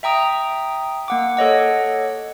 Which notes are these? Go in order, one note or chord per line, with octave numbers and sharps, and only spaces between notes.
E5 G5 A#5 D#6
A#3 F#5 D6
A4 C#5 D#5 F#5